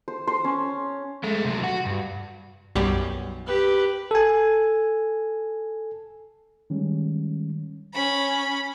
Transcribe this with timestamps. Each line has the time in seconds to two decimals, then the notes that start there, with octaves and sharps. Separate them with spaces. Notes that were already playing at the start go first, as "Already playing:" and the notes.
0.08 C5
0.27 C5
0.44 C#4
1.24 G#3 A3
1.45 C3 F#3
1.64 F#4
1.86 G2
2.75 B1 F#2 G3
3.47 G4 B4
4.11 A4 G#5
6.70 D#3 G3 G#3 C#4
7.94 C#4 B5